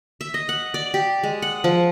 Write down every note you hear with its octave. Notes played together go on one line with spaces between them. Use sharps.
E5
D#5
F#5
D5
G4
G#3
F#5
F3